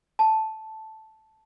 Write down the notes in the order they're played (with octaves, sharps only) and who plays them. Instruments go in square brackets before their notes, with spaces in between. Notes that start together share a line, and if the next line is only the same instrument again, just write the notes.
[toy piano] A5